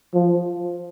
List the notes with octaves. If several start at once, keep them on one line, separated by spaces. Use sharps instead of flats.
F3